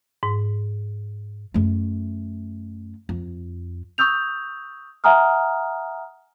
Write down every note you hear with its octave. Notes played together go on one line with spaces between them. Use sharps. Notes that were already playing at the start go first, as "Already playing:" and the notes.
G#2
F#2 A3
F2
C#6 D#6 E6 G6 F7
E5 F#5 G#5 A#5 D#6 F6